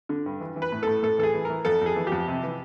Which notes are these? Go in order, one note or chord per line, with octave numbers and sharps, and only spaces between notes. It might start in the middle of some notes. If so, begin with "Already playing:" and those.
D3
G2
E3
E3
B4
A2
A2 A4
A2 A4
E3 A4
G#4
E3
E3 A#4
F2 A4
F2 G#4
E3
G4
F2
C3
E3